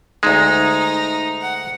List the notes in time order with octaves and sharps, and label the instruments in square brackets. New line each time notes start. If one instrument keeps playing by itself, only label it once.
[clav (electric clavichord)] D2 G#3 [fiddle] D#4
[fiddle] F#5